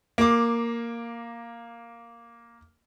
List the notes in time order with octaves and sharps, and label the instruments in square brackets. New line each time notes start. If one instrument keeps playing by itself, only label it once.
[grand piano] A#3 D6